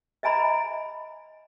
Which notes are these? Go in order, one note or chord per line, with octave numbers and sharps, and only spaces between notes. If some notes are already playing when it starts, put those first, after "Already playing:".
D#5 E5 G#5 A#5 B5